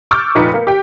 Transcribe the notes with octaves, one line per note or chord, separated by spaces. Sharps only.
C#6 D6 E6 F6 G6 A6
F1 A#2 D#4 B4 B6 C#7
A#3
G4 G5